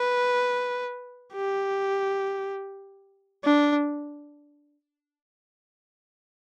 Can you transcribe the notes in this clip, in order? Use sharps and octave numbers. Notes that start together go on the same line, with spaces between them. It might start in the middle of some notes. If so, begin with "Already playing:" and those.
Already playing: B4
G4
D4